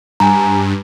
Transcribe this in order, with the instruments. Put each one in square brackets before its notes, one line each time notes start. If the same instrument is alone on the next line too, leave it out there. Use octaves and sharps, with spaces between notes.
[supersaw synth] G2 [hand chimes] G#5 A#5